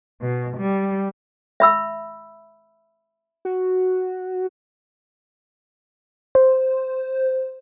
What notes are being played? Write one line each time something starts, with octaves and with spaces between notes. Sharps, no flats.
B2
G3
E5 B5 E6
F#4
C5